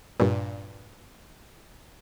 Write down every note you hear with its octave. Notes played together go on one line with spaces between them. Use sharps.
G2 A#2